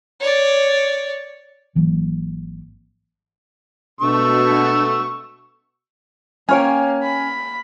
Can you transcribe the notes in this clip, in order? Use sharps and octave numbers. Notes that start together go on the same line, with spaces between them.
C#5 D5
G#1 E3 F#3 A#3
B2 A3 D4 C#6 E6
A#3 C#4 C#5 G5 G#5 F6
B5